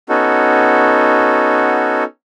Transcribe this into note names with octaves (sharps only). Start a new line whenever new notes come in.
B3 C#4 D#4 F#4 A4